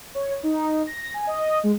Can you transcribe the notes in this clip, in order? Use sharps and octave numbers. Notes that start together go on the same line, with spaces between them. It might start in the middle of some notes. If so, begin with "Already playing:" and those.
C#5
D#4
A#6
G#5
D#5
G#3